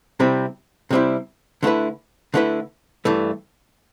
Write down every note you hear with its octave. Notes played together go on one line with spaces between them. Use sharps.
C3 G3 C4 E4
C3 G3 C4 E4
D3 A3 E4 B4
D3 A3 E4 B4
G2 E3 A3